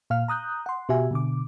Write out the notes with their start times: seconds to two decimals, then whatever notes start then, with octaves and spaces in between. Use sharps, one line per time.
0.10 A#2 F5 F6
0.28 A#5 D#6 F#6 G6
0.66 F#5 C6
0.89 B2 F#4 G4 E5 G#5
1.11 B2 D3 D6